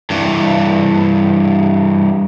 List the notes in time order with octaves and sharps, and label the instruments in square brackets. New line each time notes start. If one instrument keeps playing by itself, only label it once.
[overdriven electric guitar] G2 E3